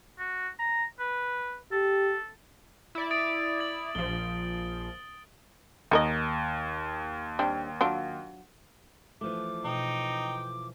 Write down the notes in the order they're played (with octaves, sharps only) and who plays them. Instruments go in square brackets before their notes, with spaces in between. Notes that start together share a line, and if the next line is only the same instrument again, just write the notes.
[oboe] F#4
A#5
B4
[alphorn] G4 [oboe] A4
[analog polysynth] E4 D5
[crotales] D#6 A6 D7
A6 F#7
[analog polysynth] A#1 F3 [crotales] G7
[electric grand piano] D#2 [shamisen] D#4 A#4 D#5
[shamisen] G3 C4 D4
F#3 D4 F4
[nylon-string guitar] E3 F3 A3 [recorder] D6
[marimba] B2 [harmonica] D#4 G5